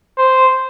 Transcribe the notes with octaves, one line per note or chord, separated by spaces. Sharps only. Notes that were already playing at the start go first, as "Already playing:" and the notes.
C5